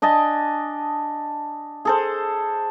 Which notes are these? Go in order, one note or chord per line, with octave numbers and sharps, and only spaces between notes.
D4 D#5 G#5 A5
G#4 A4 C5